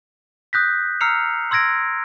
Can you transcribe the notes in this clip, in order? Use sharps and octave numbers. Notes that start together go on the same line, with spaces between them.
D#6 F#6 G6 A#6 B6
A#5 E6 F6 C7 C#7 F7
C6 E6 G#6 A#6 D7